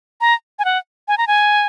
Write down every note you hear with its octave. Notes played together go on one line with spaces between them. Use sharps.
A#5
G#5
F#5
G#5
A#5
G#5